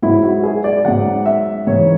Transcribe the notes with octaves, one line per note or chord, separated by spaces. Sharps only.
G#2 F#3 E4
F#4
G#4
D5
G#2 F#3 F#5
E5
G#2 E3 C#5